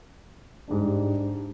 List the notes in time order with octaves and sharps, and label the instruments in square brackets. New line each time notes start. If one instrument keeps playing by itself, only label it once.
[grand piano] G#2 G3 D4